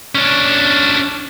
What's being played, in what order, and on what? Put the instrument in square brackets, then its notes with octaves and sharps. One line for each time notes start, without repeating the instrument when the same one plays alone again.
[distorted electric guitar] C#4 D4